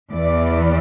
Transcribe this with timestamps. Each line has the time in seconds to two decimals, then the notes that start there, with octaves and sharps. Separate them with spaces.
0.12 E2 E3 D5